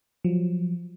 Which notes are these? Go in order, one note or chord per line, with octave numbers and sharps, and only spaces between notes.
F3 F#3